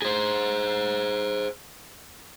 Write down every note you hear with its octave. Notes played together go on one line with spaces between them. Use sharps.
G#4 C5